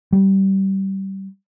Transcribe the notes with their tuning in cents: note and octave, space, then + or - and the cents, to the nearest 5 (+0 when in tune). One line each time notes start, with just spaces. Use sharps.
G3 -20